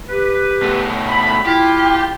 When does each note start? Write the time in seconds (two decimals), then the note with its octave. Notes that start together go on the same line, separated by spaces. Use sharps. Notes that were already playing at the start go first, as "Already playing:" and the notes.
0.08 G4 B4
0.62 B2 A3
1.08 B5
1.46 E4 F4 G4